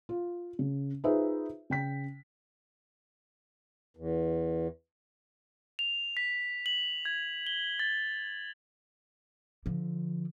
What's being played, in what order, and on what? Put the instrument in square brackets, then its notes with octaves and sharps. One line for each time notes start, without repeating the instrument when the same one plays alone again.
[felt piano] F4
C#3
D#4 F4 G#4 B4 C5 E5
C#3 G5 B6
[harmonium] E2
[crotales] F7
B6
F#7
G#6
G7
A6
[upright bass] D3 F3